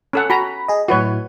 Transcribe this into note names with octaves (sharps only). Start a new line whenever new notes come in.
C#4 A4 F#5
F#4 G#5 A#5 B5
G#4 D#5
A2 F#3 E4 F#4 B4 C#5